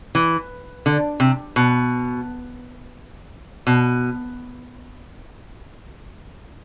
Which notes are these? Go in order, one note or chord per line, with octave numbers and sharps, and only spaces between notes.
E3
D3
C3
B2
B2